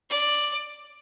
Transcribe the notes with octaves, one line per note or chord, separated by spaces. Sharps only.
D5